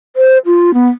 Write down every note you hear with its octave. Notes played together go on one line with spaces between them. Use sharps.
C5
F4
B3